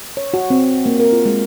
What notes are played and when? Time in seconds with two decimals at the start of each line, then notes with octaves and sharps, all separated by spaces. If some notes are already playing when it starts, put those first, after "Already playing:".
0.17 C#5
0.34 F#4
0.50 C4
0.86 A#3
1.00 A#4
1.12 F4
1.26 G#3